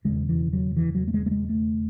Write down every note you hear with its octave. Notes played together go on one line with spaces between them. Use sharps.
E1 D#2 C#3 G#3
E3
F#3
E3
F#3
A3
G#3
A3
G#3
A3